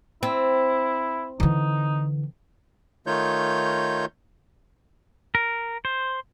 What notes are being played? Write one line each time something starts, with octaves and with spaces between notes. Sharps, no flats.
C4 E4
D3 E3 D#4
D#3 A3 D#4 F4 C#5 G6
A#4
C5